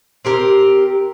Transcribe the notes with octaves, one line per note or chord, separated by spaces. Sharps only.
C4 G4 A#4